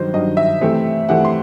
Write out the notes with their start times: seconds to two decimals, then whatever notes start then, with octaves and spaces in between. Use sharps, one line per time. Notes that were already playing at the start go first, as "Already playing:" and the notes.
Already playing: G2 D#3 F#3 C5
0.14 G2 D#3 F#3 D#5
0.37 E5
0.61 C3 E3 A3 C4
1.09 C3 E3 A3 C4 F#5
1.25 C6